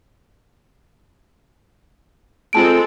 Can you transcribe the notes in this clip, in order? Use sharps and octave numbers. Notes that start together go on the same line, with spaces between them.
G#3 C4 F4 A4 A5 D7